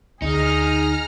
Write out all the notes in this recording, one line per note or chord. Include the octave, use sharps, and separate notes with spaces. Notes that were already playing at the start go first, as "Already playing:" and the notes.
D2 D#4 G#4 A#5 F6